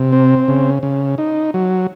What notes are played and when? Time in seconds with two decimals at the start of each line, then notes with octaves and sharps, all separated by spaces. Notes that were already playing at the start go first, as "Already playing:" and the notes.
Already playing: C3
0.12 C4
0.48 C#3
0.83 C#3
1.18 D#4
1.54 F#3